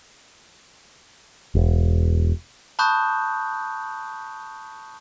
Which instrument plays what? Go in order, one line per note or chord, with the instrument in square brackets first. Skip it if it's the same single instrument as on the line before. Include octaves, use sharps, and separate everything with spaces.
[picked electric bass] E1
[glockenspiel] A5 B5 C#6 D#6 F#6 G6